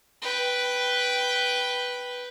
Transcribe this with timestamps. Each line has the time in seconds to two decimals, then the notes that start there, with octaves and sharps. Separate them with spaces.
0.22 B4 G5